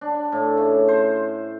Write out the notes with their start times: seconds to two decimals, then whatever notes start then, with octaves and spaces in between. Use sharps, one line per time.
0.01 D4
0.32 A2
0.57 C#3
0.88 C5